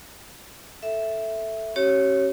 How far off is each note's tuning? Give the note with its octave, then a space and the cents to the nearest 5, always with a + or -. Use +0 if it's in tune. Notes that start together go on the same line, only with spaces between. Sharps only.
A4 +0 E5 +0
C#4 -25 G4 -40 C#5 -10